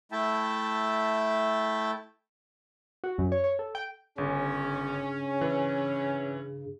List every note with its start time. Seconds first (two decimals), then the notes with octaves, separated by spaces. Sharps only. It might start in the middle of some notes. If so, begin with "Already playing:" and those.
0.12 A3 E4 E5 G5 A5
3.04 F#4
3.18 F#2
3.32 C#5
3.44 C#5
3.59 A4
3.75 G5
4.18 G1 G2 C#3 C#4
5.41 E3